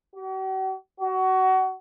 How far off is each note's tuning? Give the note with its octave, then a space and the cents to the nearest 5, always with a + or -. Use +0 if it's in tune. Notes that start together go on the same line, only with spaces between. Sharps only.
F#4 +45
F#4 +25